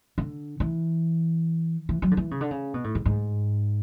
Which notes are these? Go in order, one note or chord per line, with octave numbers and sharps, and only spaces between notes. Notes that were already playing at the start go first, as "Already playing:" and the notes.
D3
E3
E3
F#3
D3
E3
C#3
D3
C#3
B2
A2
G#2
G#2